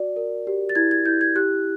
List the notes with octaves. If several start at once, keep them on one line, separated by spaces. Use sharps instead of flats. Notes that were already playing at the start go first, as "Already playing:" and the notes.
Already playing: F#4 D5
A#4
G4
A6
E4 G#6
G#6
E4 G6
G#6
G4 F#6